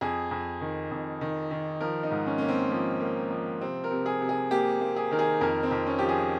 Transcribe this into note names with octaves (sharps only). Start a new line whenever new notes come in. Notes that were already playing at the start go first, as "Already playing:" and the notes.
F2 G#4
F2
D#3
F2
D#3
D#3
F3 A#4
D#4
G#2
C#4
A#3 C#4
C4
F3 A#3
A#3
F3
C3 C4
A#4
C3
G#4
C3
G#4
A#3 G4
A#3
G#4
D#3 A#4
G#4
F2 A#4
C4
F2
C#4
F3 G4
G#4